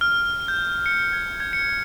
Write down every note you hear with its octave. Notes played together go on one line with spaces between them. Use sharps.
F6
G6
C#7
G#6
G#6
C#7